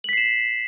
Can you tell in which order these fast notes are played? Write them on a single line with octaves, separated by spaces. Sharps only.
F#7 B6 C7 E7